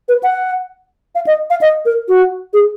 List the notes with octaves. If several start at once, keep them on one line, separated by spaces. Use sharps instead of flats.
B4
F#5
F5
D#5
F5
D#5
A#4
F#4
G#4